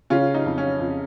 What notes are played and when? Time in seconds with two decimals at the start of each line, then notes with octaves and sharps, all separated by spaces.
0.10 C#3 C#4 F4
0.34 D#4
0.46 F2
0.58 C#4
0.80 F2